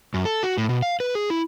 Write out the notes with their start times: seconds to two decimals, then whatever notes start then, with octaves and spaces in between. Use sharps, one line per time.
0.14 F#2
0.25 A4
0.43 F#4
0.58 A2
0.69 B2
0.82 F5
1.00 B4
1.15 G#4
1.30 E4